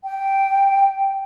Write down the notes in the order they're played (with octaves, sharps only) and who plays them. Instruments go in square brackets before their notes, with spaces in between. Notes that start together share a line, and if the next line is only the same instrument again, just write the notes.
[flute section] G5